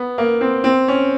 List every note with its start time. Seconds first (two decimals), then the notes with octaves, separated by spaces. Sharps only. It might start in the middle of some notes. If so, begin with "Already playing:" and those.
Already playing: B3
0.18 A#3
0.41 C4
0.64 C4
0.88 C#4